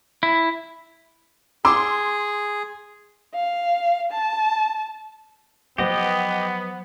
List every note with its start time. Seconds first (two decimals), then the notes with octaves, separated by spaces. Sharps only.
0.23 E4
1.65 G#4 C6 D6 E6
3.34 F5
4.12 A5
5.78 F3 F#3 B3 G4 B4 C5 D#5 F#5